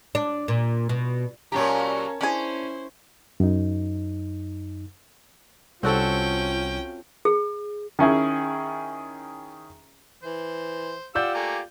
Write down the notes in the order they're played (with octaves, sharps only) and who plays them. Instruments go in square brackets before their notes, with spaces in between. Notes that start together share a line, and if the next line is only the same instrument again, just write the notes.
[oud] D4
A#2
B2
[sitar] A#2 F#3 G4 [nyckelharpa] C#4 A#4 [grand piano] C#5 A5 A#5
[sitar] C#4 [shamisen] D4 G#4 [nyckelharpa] E4 C5
[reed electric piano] F#2 D#4
[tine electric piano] C2 [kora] C4 F#4 A4 [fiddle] C#4 G5 [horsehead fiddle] F4
[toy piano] G#4
[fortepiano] D#3 C#4 E4 G#4
[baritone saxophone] E3 [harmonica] C5
[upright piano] F4 D5 G6 [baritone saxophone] G4 [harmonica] F#5 E6
[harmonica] A3 A#3 G#5